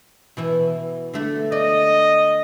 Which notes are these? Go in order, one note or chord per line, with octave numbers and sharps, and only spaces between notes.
B2 E3 E4
D3 A3
D5 D#5